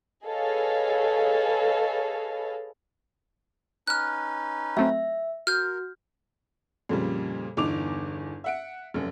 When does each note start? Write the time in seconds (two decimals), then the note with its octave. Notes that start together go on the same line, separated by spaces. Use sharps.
0.24 G#4 A4 B4 C#5 D#5 F5
3.87 C#4 D#4 B4 F6 F#6
4.77 F#3 A3 C4 E5
5.47 F#4 A#4 F6 G6
6.89 F2 A#2 C#3 G3
7.57 G1 E2 D#4 D6 F7
8.44 E5 F#5 D7
8.94 F1 F#2